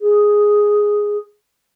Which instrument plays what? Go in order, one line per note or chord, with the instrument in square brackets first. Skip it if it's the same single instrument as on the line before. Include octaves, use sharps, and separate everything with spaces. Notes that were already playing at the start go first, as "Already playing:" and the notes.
[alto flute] G#4